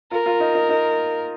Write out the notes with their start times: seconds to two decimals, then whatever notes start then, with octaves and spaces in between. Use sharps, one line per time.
0.11 F4 A#4
0.26 F4
0.40 D#4
0.55 D#4
0.69 D#4